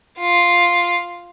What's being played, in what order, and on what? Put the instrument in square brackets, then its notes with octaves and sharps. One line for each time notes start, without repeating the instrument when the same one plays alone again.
[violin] F4